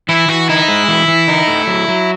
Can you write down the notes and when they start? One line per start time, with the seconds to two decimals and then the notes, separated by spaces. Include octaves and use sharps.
0.09 E3 E4
0.28 E3 F#4
0.49 D#4 E4
0.68 G#3
0.88 E3
1.08 E3
1.28 D#4
1.48 A3
1.67 F#3
1.88 F#3